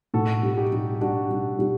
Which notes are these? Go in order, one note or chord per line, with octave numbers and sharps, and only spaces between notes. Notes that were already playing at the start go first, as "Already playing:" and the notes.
A2 F#4 A4
G3
F#4
D#4 G4
G3
G4
G3 D4 F#4
G3
G3